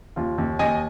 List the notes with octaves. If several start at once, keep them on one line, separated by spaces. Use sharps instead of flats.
D#2 F4
D#2
D#2 D#5 G#5